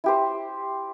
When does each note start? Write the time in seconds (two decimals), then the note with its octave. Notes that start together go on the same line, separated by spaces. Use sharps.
0.04 E4 G4 C5